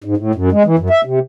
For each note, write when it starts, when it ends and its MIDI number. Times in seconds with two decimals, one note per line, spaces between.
0.04 0.15 44
0.17 0.32 45
0.35 0.49 42
0.52 0.63 56
0.66 0.76 52
0.79 0.89 42
0.90 1.01 76
1.05 1.19 48